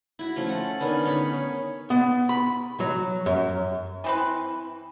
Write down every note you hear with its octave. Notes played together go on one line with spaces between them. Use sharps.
E4 F#4
F3 A3 C#4
A4 F#5
D3 D#3 B3 C#4
C#4 D#4 C#5 B5
C#5
B3
B5
F#3
F#2
E3 C4 B4